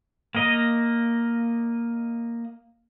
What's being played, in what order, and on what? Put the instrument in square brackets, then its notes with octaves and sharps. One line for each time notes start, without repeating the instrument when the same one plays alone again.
[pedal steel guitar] A#3 D#5